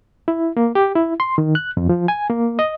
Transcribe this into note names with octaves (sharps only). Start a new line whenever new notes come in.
E4
A#3
G4
E4
C6
D#3
F#6
F2
F3
G#5
A#3
D#5